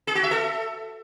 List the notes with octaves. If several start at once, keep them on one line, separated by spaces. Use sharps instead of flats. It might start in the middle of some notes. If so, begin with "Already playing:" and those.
G#4
F#4
E5
A4